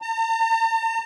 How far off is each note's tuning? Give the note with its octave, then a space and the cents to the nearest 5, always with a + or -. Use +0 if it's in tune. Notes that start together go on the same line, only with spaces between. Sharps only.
A#5 -45